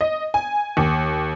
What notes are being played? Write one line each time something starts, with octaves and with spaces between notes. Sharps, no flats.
D#5
G#5
D#2